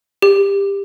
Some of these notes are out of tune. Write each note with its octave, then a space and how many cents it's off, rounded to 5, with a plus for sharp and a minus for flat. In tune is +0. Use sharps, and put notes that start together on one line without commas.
G4 +20